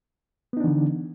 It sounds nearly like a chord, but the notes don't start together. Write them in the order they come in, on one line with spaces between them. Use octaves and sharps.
B3 D#4 D4 E3 D3